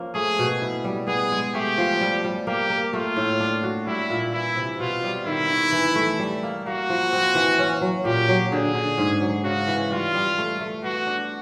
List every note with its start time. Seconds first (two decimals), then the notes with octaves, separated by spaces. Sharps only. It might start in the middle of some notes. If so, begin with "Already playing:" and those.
Already playing: F3 A#3 C#4
0.14 A3 G#4
0.39 B2
0.62 E4
0.84 G3
1.07 B3 G#4
1.32 G#3
1.55 A3 G4
1.78 F3
2.01 G3
2.24 G3
2.47 A#3 G4
2.70 A#3
2.93 A3 F4
3.17 A2
3.40 D4
3.63 F#4
3.87 G3 E4
4.10 A#2
4.33 E3 E4
4.56 C3
4.80 B2 F4
5.04 G3
5.26 D#3 E4
5.50 D#3
5.72 E3
5.95 A3
6.19 G3
6.43 A#3
6.66 A#3 F#4
6.90 F3
7.13 C4
7.35 E3
7.59 C#4
7.81 F#3
8.05 A#2 G4
8.29 F#3
8.52 D3 G#4
8.75 D3
8.98 G#2
9.22 F#3
9.44 C#3 F#4
9.67 E3
9.90 G3 F4
10.14 G3
10.38 A3
10.60 A3
10.84 B3 F#4
11.07 D4